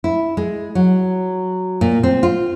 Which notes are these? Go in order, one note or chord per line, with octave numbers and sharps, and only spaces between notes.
E4
G#3
F#3
A#2
C4
F4